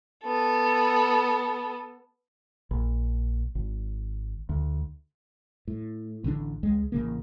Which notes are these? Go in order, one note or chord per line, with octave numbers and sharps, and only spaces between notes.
B3 A4
A#1
G#1
D2
A2
A1 D3 B3 D4
C#2 G#3
A1 C#3 A#3